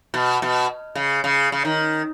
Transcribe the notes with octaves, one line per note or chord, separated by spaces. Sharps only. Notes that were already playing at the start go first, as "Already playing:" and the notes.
B2
B2
C#3
C#3
C#3
D#3